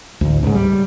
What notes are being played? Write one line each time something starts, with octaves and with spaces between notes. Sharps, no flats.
A1 D2
C#2 G#2
G3